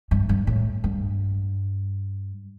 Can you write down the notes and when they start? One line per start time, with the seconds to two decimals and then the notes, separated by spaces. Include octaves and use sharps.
0.11 G2
0.29 G2
0.47 A2
0.84 G2